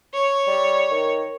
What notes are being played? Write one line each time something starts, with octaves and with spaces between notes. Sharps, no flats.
C#5
G3
D#3